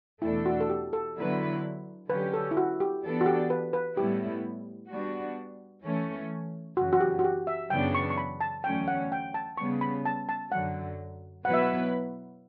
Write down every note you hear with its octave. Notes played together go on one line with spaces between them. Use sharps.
E2 B2 A3 D4 E4 A4
F#4
A4
G4
A4
D3 F#3 B3 E4 B4
D3 F#3 C#4 G4 B4
A4
E4
F#4
G4
E3 B3 D4 A4 D5
F#4
G4
B4
B4
A2 G3 B3 E4 G4
G3 B3 D4 F#4
E3 A3 C#4
F#2 C#3 E3 F#4
F#4
G4
F#4
G4
E5
F#2 C#3 E3 B3 D4 G5
C#6
C#6
B5
A5
E2 D3 F#3 A3 C#4 G5
F#5
G5
A5
C#3 G3 B3 C#6
B5
A5
A5
F#2 D3 F#3 F#5
B2 F#3 B3 E4 B4 F#5
E5
F#5